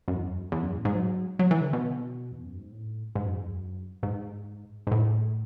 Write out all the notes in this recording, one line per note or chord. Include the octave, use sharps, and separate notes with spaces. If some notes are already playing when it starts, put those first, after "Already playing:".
F#2
E2
F#2
E2
F#2
A2
G#2
F#3
F#3
E3
D3
B2
E2
F#2
G#2
A2
G#2
F#2
E2
F#2
G#2
G#2
A2